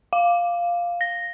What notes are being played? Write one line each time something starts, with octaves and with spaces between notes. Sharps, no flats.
F5
A#6